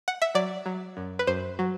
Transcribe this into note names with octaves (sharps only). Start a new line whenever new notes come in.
F#5
E5
F#3 D5
F#3
F#2
B4
F#2 C5
F#3